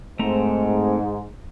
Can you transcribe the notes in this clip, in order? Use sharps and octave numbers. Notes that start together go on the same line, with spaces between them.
G#2 A3 C4 A#5